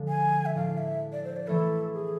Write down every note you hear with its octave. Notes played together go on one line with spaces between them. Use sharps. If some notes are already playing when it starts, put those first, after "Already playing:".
Already playing: D3 F3 G#3
G#5
E5
A2 F3 G#3 D4 F5
E5
D5
C5
D5
E3 A3 E4 A4
G#4